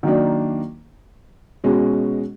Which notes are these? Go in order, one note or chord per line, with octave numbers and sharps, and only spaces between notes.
D#3 F#3 A#3 D4
B2 G#3 C#4 F#4